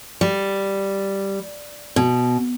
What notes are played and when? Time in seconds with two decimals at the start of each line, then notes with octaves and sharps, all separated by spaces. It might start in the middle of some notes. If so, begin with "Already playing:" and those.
0.21 G3
1.96 B2